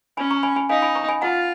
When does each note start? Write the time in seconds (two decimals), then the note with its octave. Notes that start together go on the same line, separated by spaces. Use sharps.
0.17 C#4 G#5 B5
0.31 A#5 C#6
0.43 G#5 B5
0.56 G#5 B5
0.69 D#4 F5 G#5
0.82 G#5 B5
0.95 A#5 C#6
1.09 G#5 B5
1.21 F4 F#5 A#5